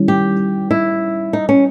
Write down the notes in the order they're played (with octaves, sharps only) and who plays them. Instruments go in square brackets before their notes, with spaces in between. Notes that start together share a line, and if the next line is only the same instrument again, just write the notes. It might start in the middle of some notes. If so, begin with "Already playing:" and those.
Already playing: [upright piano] D#3 G3 C#4 E4
[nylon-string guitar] G4
E4
D#4
C#4